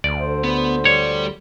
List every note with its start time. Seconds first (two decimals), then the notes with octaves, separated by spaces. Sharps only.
0.04 D2 D5
0.19 D3 C5
0.44 B3
0.85 G3 C#5 D5